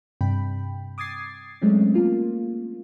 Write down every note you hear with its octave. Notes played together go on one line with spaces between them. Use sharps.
G2 C3 G5 B5
D6 D#6 G#6 A6 C7
F#3 G#3 A3 C4 C#4
A#3 F4